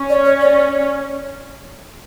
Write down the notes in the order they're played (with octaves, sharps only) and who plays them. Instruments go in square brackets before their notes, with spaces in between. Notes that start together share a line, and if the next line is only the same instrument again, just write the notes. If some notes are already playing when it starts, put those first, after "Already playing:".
Already playing: [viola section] C#4
[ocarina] D5
C#5
D5